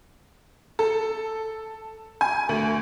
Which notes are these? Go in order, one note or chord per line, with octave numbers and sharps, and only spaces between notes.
A4
G#5
D2